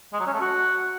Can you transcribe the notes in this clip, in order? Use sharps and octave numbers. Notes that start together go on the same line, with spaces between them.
G#3
F#3
C#4
A3
F#4